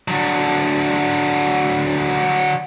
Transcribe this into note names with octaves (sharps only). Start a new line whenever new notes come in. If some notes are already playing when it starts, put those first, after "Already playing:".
D3 F#3